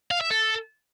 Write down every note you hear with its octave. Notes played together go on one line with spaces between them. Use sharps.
F5
E5
A4